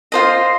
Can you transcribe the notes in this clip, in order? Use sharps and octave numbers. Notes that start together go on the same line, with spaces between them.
F4 C5 D#5